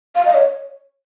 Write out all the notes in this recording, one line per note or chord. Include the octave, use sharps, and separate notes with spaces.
F5
D#5
C#5